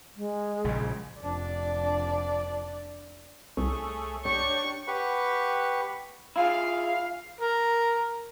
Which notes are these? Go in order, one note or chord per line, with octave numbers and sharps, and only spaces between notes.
G#3
A#1 C#3
F1 D4 D5
C2 A3 G#4 C#5
D4 G4 C#5 C#6
G4 B4 F#5 B5 C#6
E4 F4 G#4 F5
A#4